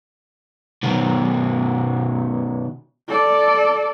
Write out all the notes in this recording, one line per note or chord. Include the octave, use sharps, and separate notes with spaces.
B2 D#3
A4 D5